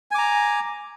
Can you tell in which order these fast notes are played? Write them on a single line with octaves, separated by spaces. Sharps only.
G#5 D6 A#5